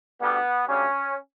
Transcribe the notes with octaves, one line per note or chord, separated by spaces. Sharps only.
D2 D3 G3 B3
D2 C#3 G3 C#4